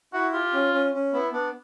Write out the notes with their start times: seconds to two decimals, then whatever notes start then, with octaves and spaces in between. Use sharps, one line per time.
0.13 E4 F#4
0.32 F4 G4
0.53 C#4
0.73 C#4
0.94 C#4
1.13 B3 E4
1.33 B3 D4